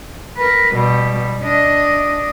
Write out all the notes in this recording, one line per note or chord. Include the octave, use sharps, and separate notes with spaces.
A#4 B4
B2 G3
D4 D#5